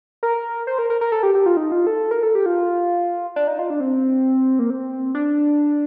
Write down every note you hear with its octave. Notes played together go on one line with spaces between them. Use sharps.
A#4
C5
A#4
A#4
A#4
A4
G4
G4
F4
D#4
F4
A4
A#4
A4
G4
F4
D4
D#4
F4
D4
C4
A#3
C4
D4